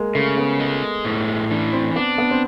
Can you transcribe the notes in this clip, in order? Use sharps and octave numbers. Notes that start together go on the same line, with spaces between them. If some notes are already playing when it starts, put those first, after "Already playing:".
Already playing: G#3 A#3
C#3 A3
B3
G#3
A2
E3 D4
C4
B3 D4
B3
C4